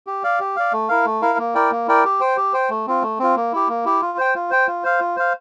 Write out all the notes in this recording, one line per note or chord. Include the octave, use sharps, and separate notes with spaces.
G4
D5 F5
G4
D5 F5
A3
E4 A#4 F5
A3
E4 A#4 F5
A#3
E4 A#4 D5 G5
A#3
E4 A#4 D5 G5
G4
C5 G5
G4
C5 G5
A3
C4 F4
A3
C4 F4
A#3
E4 G4
A#3
E4 G4
F4
C5 G5
F4
C5 G5
F4
C5 F5
F4
C5 F5